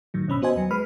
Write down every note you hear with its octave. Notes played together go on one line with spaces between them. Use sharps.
A2 D#3 F#3
G#1 B2 C#4 B5 E6
B3 F#4 C5 D#5 G#5
D#2 F#3
G#3 B4 B5 F6